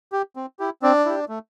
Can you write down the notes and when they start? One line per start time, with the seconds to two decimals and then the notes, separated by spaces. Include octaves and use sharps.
0.12 G4
0.36 C4
0.59 E4 G4
0.82 C4 D4 D5
1.05 E4 G4
1.29 A3